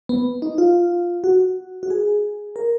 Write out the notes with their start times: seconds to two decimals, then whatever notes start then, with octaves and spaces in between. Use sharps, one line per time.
0.09 B3
0.42 D#4
0.58 F4
1.24 F#4
1.83 F#4
1.90 G#4
2.56 A#4